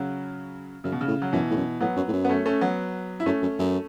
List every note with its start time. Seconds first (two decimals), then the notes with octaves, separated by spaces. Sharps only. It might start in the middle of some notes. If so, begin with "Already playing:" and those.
Already playing: C#3 F#3
0.84 F#2 C#3
0.92 B2
1.01 C#3
1.08 A2
1.22 F#3
1.33 F#2 B2 E3
1.51 A2
1.56 F#2
1.80 A2 F#3 B3
1.96 F#2
2.08 A2
2.13 F#2
2.24 B3
2.29 A3 C#4
2.46 A3 C#4
2.61 F#3 B3
3.20 E4
3.26 F#2 A3 C#4
3.42 F#2
3.59 F#2